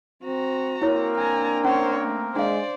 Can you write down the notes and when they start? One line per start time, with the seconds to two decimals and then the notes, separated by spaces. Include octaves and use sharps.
0.23 C4 F#4 A#5
0.82 A#3 C4 E4 A#4 C#5
1.18 D4 G#5 A#5
1.65 C#4 C5 C#5
2.04 A3
2.36 G#3 D4 C5 D5 F5